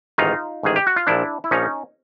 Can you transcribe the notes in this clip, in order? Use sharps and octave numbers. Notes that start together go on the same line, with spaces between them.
A1 G#2 D#3 D#4 F4
A1 G#2 D#3 G#4
G4
F#4
F4
A#1 A#2 F3 D4 E4
E4
A#1 A#2 F3 C#4 D#4